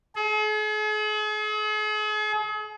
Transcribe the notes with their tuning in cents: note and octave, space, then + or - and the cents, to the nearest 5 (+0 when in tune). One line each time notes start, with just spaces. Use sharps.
G#4 +45